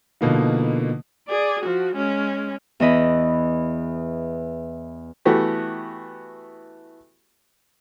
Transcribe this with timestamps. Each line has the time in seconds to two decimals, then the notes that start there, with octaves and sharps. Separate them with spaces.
0.21 B2 D3 F3 A#3 B3 D#4
1.28 G#4 D5
1.63 F3 F#4
1.96 G#3 C#4
2.80 E2 E3 D#5 B5
5.25 E3 A3 B3 F#4 G4